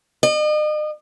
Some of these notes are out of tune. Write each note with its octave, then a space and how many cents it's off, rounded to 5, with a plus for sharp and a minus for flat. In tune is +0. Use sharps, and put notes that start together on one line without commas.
D#5 -40